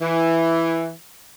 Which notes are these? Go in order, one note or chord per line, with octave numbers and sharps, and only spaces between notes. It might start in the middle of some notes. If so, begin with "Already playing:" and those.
E3